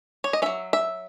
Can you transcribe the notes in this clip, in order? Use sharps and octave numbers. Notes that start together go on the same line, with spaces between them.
C#5
D#5
F#3 C#4 E5
E5